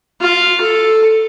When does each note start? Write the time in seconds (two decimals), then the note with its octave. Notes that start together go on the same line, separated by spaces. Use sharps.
0.21 F4
0.61 A4